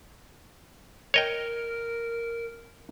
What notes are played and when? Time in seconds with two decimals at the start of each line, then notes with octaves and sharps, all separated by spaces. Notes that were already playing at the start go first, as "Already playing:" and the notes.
1.14 A#4 C#5 D#5 G5